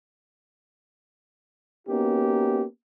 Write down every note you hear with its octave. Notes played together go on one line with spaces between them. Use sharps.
A#3 B3 C#4 D#4 F#4 G4